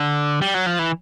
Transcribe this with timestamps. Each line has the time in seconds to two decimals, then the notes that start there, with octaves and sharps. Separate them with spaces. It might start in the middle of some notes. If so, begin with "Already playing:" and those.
Already playing: D3
0.41 G3
0.54 F#3
0.66 F3
0.79 E3